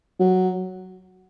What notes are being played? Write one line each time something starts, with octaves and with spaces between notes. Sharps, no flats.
F#3